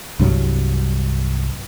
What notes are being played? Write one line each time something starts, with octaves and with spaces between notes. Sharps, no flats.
C2 G2 F#3